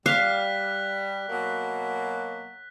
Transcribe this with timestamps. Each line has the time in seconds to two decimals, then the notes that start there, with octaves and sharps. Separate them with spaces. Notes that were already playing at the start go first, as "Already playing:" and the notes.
0.06 G3 F5 F#6 B6
1.29 B2 F#3 A#3